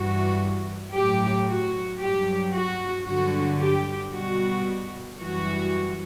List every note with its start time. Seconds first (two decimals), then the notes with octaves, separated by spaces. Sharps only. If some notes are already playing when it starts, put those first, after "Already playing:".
Already playing: G2 E3 G3 F#4
0.94 A2 F#3 G4
1.47 F#4
2.00 G2 F#3 G4
2.53 F#4
3.07 G2 D3 F#3 F#4
3.60 G4
4.12 B2 G3 F#4
5.19 F#2 E3 G3 F#4